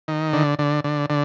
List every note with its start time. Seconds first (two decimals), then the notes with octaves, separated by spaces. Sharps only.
0.08 D#3
0.33 D3
0.59 D3
0.84 D3
1.10 D3